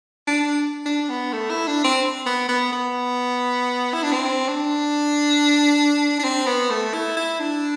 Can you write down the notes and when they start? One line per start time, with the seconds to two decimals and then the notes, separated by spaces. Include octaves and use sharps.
0.28 D4
0.86 D4
1.10 B3
1.33 A3
1.50 E4
1.68 D4
1.84 C4
2.26 B3
2.49 B3
2.73 B3
3.94 E4
4.03 D4
4.13 C4
4.49 D4
6.19 D4
6.24 C4
6.46 B3
6.70 A3
6.94 E4
7.17 E4
7.40 D4